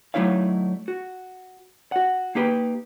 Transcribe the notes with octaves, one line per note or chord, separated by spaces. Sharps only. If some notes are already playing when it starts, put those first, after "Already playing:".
F#3 A3 D#4 E4 C#5 F5
F#4
F#4 F#5
A#3 D#4 G4 B4